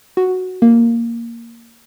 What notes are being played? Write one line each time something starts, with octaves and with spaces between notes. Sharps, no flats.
F#4
A#3